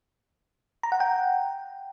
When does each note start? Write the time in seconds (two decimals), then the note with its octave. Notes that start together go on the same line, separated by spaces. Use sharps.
0.83 A#5
0.92 F#5
1.00 G5